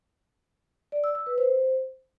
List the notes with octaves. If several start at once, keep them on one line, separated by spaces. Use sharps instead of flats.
D5
E6
E6
B4
C5